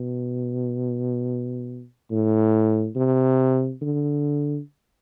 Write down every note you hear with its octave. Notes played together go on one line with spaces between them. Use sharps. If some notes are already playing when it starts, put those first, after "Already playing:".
Already playing: B2
A2
C3
D3